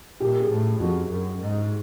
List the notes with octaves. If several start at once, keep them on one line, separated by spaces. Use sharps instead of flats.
A#2 G4
G#4
A2
F2 F#4
F#2
G#2